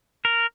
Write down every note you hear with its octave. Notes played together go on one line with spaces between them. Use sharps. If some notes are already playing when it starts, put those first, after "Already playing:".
A#4